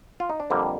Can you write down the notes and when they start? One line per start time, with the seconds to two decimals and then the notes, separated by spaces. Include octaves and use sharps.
0.20 F4
0.30 D#4
0.40 D4
0.50 F2 D3 G3 A#3 C4